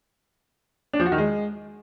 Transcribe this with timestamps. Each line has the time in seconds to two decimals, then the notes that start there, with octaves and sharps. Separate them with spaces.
0.93 D4
1.00 F3
1.06 F#4
1.12 D#3
1.18 G#3